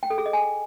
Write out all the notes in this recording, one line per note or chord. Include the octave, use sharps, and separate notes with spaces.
G5
A4
G#4
D#5
G#5